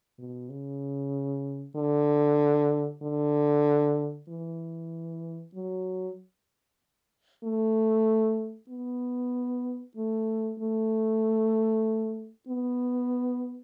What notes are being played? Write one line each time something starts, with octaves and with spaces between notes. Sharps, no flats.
B2
C#3
D3
D3
E3
F#3
A3
B3
A3
A3
B3